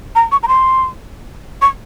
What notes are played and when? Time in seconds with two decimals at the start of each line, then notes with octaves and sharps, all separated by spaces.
0.15 A#5
0.32 C#6
0.43 A#5
0.48 C6
1.61 C#6